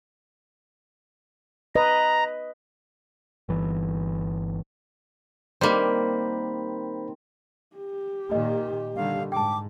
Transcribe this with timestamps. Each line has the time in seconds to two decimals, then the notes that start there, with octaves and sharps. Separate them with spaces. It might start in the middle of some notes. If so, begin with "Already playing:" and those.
1.75 B4 D#5 A#5
3.49 G1 E3
5.61 D#3 G3 A#3 C4 C5 B5
7.76 G4
8.32 A#2 D#3 D#5
8.96 D3 D#3 G3 F5
9.32 G#2 G5 A5 D6